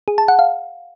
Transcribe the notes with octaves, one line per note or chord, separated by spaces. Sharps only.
G#4
A5
F#5
F5